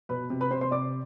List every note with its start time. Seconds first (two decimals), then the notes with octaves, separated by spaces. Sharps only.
0.09 B2 B4 B5
0.30 C3
0.41 B4 B5
0.51 C3 C5 C6
0.61 C5 C6
0.71 C3 D5 D6